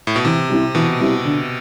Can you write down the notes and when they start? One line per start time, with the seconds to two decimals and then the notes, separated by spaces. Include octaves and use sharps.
0.07 A2
0.16 B2
0.25 C3 E3
0.50 G3 C4 E4
0.75 B2 E3
1.00 G3 C4 E4
1.25 D3